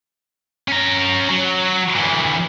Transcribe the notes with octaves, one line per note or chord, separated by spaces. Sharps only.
C#4 A#5
F#3
D2 E3